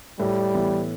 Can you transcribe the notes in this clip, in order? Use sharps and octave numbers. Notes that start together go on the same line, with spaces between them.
A2 G3
E3 B3